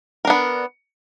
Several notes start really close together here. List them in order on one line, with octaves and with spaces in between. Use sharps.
A#4 D4 B3